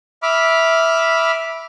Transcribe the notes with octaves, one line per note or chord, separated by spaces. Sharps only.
E5 B5 D6 F6